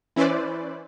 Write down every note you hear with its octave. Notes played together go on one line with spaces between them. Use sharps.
E3 C#4 E4 B4 C5 D5